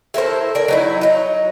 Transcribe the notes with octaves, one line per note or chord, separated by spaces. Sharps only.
E4 A4 A#4 C5
A#4 D5
F#3 D#4 E4
F#3 D#4